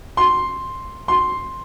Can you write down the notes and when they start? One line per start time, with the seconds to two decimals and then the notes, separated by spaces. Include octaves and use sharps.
0.17 C6
1.08 C6